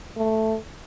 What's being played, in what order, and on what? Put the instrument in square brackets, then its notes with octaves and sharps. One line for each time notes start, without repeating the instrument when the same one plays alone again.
[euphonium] A3